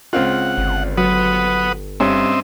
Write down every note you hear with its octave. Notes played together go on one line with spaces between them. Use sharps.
C#2 C4 F4 F#5
G1
F#3 B4 F#5 D#6
G2 C4 C#4 D#5 E5